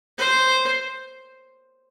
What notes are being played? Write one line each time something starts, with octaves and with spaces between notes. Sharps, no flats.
C5